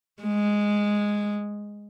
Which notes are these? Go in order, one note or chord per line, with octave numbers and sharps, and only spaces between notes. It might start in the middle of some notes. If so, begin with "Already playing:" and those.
G#3